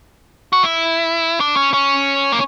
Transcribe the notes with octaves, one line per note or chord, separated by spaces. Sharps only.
F#4
E4
D4
C#4
C#4
A#3